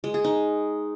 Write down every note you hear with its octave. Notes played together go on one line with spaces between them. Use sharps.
G#3
G#4
D#4